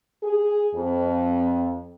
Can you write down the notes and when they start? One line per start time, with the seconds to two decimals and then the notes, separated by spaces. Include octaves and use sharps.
0.23 G#4
0.75 F2